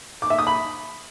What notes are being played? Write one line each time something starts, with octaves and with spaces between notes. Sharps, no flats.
D6
E5
D#6
B5